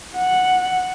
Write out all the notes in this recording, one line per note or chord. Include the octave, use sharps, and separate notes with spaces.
F#5